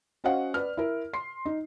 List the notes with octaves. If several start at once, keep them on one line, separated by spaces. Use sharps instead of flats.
C#4 F#4 C5 D#5 F5 F#5
B4 D5 F6
E4 A#4
C6 C7
D#4